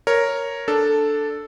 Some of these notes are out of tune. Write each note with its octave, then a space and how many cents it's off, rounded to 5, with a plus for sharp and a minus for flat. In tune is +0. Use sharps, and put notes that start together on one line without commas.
A#4 +0 C#5 +0
D4 +5 A4 +0